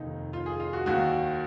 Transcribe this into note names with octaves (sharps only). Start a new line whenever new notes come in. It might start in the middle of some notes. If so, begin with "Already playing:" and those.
Already playing: F1 D#2 D#3 D#4
F4
G#4
F4
F#4
D#2 D#3 F#4